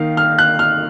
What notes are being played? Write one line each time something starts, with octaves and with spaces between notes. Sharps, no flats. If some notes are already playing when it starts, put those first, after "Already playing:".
Already playing: D#3 A#3 D#4 F5
F6
F#6
F6